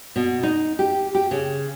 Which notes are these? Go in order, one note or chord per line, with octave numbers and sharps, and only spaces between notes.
B2
D#4
G4
G4
C#3